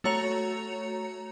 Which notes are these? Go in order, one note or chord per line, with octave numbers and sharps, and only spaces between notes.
A3 F#4 C#5 A#5 C#7 F7